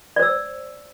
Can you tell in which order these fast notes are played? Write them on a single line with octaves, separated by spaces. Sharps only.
D5 C5 E6